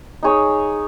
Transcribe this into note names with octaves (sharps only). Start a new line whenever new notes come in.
D#4 G#4 C#5